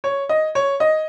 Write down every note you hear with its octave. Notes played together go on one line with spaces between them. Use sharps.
C#5
D#5
C#5
D#5